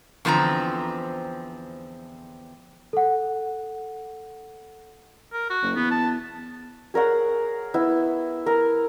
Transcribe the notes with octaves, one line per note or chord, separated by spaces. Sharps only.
E2 D3 F3 C4 A#5
A4 F#5
A#4
F#4
F#1
E2 B3
A5
G#4 A#4 C#5 F#5
B3 E4
A#4